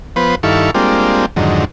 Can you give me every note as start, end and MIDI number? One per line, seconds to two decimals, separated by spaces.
0.16 0.35 53
0.16 0.35 59
0.16 0.35 71
0.16 0.35 72
0.43 0.71 43
0.43 0.71 51
0.43 0.71 64
0.43 0.71 69
0.43 0.71 77
0.43 0.71 85
0.75 1.26 55
0.75 1.26 56
0.75 1.26 58
0.75 1.26 60
0.75 1.26 62
0.75 1.26 65
1.36 1.65 41
1.36 1.65 44
1.36 1.65 50
1.36 1.65 51
1.36 1.65 54